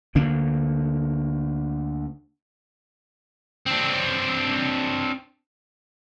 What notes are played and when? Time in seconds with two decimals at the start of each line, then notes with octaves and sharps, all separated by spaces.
0.15 D2 D3 A#3 D4
3.66 C4 D4